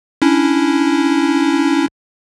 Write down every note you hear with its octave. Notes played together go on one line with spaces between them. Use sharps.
C#4 D4 E4